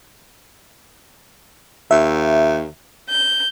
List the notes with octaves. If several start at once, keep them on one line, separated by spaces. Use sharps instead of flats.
D#2 E5
G6